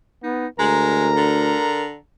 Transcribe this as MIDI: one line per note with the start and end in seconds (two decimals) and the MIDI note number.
0.23 0.46 59
0.23 0.47 63
0.59 1.58 38
0.59 1.10 56
0.59 1.86 70
0.59 1.97 82
1.16 1.96 50